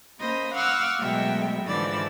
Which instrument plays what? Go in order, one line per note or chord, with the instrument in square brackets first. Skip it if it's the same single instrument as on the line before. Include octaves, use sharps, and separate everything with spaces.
[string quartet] A#3 C#4 C5 D#5 B5
F5 F#5 C#6 D6 E6 F6
B2 F#3 G#3 A3 E5 G5
G#2 D3 E3 F3 D5 E6